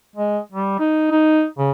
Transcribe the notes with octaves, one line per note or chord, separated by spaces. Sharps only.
G#3
G3
D#4
D#4
C#3